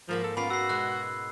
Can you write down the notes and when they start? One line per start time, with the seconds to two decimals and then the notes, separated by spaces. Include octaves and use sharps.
0.09 G#2 F3 A#3 B5
0.24 A4
0.37 B3 C#4 F4 D5 B5 C7
0.50 F#4 E6 C7
0.69 B2 G#3 F#6